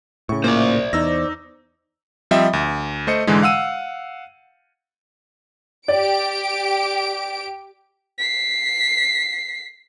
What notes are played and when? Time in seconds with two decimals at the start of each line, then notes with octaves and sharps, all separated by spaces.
0.29 A2 C#3 C#6
0.44 A#2 A#3 C5 D5
0.93 E2 D#4 E6 A#6
2.31 F3 G3 C4 D#5 E5
2.53 D2
3.07 A3 C5 D#5 C#7
3.27 G#2 D3 E3 G#3
3.43 F5 F#5 E6 D#7
5.88 G4 D5 D7
8.19 B6 C7